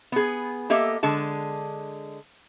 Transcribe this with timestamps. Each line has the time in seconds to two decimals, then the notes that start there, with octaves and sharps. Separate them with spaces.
0.12 B3 G#4
0.70 A#3 G4 A4 D#5 E5
1.03 D3 G#3 A5